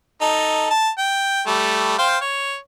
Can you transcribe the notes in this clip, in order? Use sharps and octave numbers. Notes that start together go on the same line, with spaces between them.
D#4 A4
A5
G5
G3 A3
C5 F5 G5
C#5